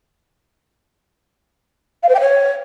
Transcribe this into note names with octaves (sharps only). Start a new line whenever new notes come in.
F5
C5
G5
C#5